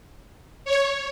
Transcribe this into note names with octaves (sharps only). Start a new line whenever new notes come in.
C#5